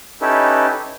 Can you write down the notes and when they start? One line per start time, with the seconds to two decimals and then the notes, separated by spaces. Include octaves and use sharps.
0.22 C#4 D#4 E4 G4 A4 B4